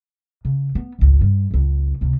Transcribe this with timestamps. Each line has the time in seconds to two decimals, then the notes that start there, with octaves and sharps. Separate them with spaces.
0.45 C#3
0.75 B3
0.99 G#1 C#2
1.21 G2
1.51 F#1 C#2
2.01 C#2 C3